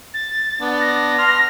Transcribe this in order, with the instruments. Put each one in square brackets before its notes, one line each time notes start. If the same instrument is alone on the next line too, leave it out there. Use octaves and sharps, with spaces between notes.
[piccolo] A6
[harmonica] B3 D4
[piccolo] A#6
[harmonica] C6 F6